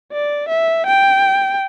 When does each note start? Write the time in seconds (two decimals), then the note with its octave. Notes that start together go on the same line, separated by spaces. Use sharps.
0.13 D5
0.49 E5
0.87 G5